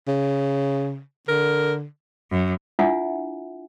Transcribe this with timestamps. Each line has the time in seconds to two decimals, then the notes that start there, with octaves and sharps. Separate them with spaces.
0.07 C#3
1.29 D3 A#4
2.31 F#2
2.79 D4 E4 F4 E5 F#5 G#5